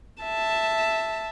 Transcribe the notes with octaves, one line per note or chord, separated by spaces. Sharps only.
E5 A5